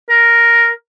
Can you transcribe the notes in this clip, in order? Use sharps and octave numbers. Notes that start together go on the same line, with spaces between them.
A#4